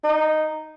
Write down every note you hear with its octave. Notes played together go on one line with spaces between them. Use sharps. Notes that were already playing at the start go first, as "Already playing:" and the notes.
D#4